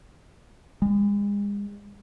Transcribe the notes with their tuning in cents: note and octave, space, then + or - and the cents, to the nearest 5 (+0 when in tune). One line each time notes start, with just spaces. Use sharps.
G#3 -40